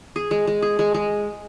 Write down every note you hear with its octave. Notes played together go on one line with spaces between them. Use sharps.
G#4
G#3
G#3
G#4
G#3
G#3